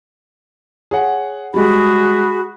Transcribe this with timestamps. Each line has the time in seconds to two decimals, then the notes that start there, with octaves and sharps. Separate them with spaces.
0.91 G#4 C#5 F#5
1.54 G3 G#3 F#4 G#4 B5